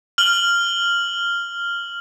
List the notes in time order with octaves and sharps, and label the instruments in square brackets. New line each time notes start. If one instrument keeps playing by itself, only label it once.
[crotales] F6 F#7